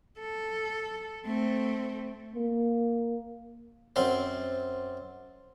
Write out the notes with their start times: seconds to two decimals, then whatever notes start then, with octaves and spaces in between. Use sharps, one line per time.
0.19 A4
1.26 A3 C4
2.36 A#3
3.96 F#2 C4 C5